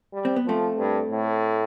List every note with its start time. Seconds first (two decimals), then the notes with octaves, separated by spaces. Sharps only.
0.14 G3
0.25 C4
0.36 B3
0.46 F3 A3 C4
0.78 G2
1.11 A2